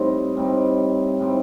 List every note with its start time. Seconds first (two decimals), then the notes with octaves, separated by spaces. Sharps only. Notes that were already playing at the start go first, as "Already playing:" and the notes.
Already playing: A2 G3 C4 D#4
0.37 A2 G3 C4 D#4
1.20 A2 G3 C4 D#4